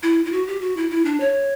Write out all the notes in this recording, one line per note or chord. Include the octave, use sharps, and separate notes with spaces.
E4
E4
F#4
G4
F#4
E4
E4
D4
C#5